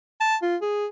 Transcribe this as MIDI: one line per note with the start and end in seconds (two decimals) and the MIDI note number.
0.20 0.36 81
0.42 0.56 65
0.62 0.86 68